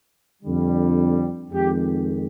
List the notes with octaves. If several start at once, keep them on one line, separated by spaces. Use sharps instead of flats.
F2 D3 G3
F2 D#3 G#3 G4